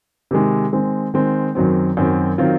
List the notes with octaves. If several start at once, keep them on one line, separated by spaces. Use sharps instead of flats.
C3 D#3 G#3
D#3 G#3 C4
D#3 G#3 C4
F#2 D#3 F#3 C4
F#2 D#3 F#3 C4
D#3 F#3 C4 F4